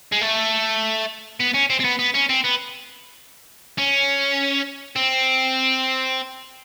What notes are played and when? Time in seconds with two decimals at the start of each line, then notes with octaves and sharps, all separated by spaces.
0.12 G#3
0.21 A3
1.40 B3
1.54 C#4
1.70 C4
1.80 C4
1.85 B3
1.99 B3
2.14 C#4
2.29 C4
2.44 B3
3.78 C#4
4.96 C4